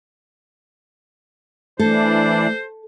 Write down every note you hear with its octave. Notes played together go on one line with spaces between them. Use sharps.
E3 A3 D4 A4 C5